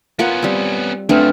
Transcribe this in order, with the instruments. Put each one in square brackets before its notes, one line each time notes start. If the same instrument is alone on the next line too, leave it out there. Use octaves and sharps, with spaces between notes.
[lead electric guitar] B3 C#4 [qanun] F4 A#4 F#5
[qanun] G3 C4
[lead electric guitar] F#2 F3 [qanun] A3 C4 [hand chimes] D4 B4 F6